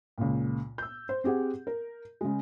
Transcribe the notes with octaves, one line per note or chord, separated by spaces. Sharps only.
C#2 A#2
E6 G6
C5
C4 G4 G#4 F#5
A#4
C#3 G#3